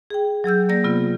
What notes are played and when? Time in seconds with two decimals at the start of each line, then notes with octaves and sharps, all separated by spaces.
0.10 G#4 G5
0.44 F#3 G#4 E6 G6
0.69 A#3 D5 A#6
0.84 C3 B3 F4